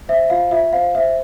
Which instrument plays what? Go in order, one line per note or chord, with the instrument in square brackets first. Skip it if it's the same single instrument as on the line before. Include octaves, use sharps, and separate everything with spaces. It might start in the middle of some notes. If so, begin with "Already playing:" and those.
[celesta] C5 E5
F4 F5
F4 E5
C5 F5
C5 E5